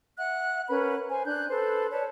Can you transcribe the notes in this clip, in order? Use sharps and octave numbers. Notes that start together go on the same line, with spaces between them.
E5 F#5 F#6
C#4 A#4 B4 B5
C5 G#5
D4 F#6 G6
A4 B4 C5
B4 C#5 D5 A5